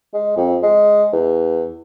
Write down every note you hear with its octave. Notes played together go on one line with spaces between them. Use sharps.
G#3
F2
G#3
E2